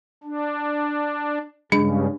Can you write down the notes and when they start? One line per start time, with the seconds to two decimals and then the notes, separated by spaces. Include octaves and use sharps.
0.24 D4
1.72 G2 C#3 G#3 D4